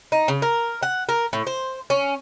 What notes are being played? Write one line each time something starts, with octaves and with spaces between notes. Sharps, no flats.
D#4
C#3
A#4
F#5
A#4
A2
C5
C#4